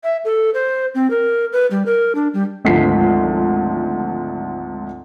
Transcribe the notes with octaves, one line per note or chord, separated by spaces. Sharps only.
E5
A4
C5
C4
A#4
B4
G3
A#4
D4
G3
G#1 D2 G#2 F3 B6 C7